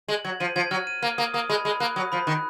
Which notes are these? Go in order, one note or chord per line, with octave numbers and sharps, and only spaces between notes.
G#3 F#7
F#3 G#6
F3 D#7
F3 G#6
F#3 F6
D#7
A#3 F6
A#3 D#6
A#3 D#6
G#3 B5
G#3 B5
A#3 F#6
F#3 D#6
F3 B5
D#3 F#6